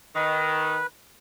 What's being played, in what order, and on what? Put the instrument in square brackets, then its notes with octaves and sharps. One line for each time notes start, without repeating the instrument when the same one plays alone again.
[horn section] D#3 [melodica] B4